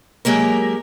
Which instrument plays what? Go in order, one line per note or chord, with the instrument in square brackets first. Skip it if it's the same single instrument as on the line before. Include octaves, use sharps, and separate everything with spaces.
[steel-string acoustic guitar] F#3 G#3 A#3 G4 A#4